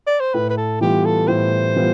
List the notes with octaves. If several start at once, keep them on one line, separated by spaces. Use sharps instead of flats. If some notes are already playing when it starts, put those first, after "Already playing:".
D5
C5
A2 B4
B4
A4
E3 G3 B3 F4 G4
A4
A2 C5
E3 G3 B3 F4